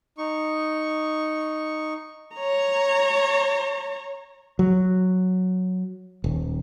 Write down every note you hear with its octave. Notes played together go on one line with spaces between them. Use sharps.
D#4 C#6
C#5 A#5
F#3
D#1